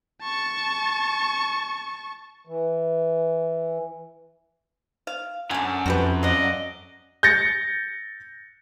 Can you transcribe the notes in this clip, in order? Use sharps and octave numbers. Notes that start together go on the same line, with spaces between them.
A5 C#6
E3
F5
F#2 D3 G#5 A5
F2 F#4 G4 B4
D5 D#5 F5 F#5
G6 A6 A#6 C#7